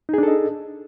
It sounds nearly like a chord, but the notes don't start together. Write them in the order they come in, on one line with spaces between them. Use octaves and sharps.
D#4 G#4 D4 A4 D#5